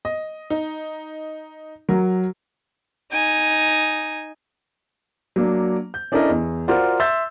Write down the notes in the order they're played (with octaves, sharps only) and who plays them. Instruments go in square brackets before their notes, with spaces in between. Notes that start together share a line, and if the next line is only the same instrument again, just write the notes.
[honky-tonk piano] D#5
D#4
[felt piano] F#3 [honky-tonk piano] A#4
[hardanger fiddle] D#4 G#5
[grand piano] F#3 A#3 D4
G6
C#4 D4 E4 A4 A#4 D#5
E2
F4 F#4 A#4 C5 D5 F#5
E5 C6 E6 G6 A6